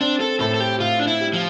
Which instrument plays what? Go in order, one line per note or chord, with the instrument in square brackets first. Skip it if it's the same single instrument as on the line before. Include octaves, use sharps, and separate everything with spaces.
[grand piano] C4 [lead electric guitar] D4
[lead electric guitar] A4
[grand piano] A2 [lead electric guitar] A4
[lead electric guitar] A4
G4
[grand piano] A2 [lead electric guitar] F4
[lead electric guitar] D4
E4
[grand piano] G3
[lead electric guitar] F3